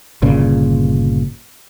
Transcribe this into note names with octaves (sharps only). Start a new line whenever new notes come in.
G1 A#2 C#3